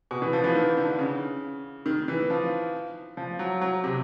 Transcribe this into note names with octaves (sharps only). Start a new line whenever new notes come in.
B2
E3
F3
E3
D#3
D3
C#3
D#3
E3
F3
F3
F#3
F#3
C3